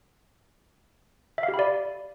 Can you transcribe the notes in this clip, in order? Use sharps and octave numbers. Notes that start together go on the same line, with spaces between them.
E5
F5
G4
B5
D5